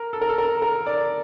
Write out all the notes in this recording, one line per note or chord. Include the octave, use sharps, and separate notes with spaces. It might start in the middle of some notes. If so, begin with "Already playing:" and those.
Already playing: A#4
A4
A#4
A4
A#4
A#4
D5